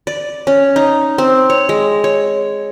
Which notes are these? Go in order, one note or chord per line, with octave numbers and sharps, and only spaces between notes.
D5
C#4
D#4
C4
C#5
G#3
C#5